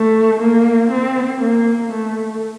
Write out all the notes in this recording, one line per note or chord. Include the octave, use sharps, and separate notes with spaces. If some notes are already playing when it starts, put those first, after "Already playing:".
Already playing: A3
A#3
C4
A#3
A3